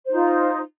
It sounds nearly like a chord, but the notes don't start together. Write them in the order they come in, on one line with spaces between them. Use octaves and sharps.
C5 D#4 F4